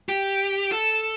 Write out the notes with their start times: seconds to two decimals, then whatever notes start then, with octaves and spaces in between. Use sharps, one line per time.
0.09 G4
0.72 A4